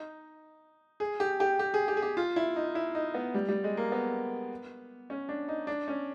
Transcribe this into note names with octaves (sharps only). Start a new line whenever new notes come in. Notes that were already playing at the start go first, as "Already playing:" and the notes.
Already playing: D#4
G#4
G4
G4
G4
G#4
G4
G#4
G4
F4
E4
D#4
E4
D#4
B3
G3
G3
G#3
A#3
B3
C#4
D4
D#4
D4
C#4